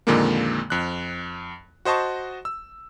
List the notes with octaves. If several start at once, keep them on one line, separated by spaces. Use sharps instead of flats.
F2 A#2 D3 D#3 G#3 A#3
F2 F#6
F#4 C5 D#5 A5 C#6
E6